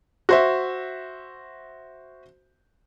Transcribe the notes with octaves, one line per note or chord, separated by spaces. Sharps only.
F#4 C5 E5